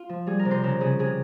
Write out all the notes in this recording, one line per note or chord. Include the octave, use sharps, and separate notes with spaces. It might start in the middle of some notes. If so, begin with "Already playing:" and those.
Already playing: F4
F3
G3 G#4
A#4
C3
C5
C#3 A#4
C#3 G#4
C3 G#4